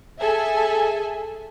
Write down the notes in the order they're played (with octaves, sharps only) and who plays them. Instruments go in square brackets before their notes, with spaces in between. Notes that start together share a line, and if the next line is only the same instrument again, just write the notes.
[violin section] G#4 A4 E5 G#5